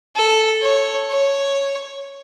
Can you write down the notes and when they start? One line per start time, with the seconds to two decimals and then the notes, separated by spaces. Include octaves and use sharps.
0.16 A4
0.62 C#5
1.10 C#5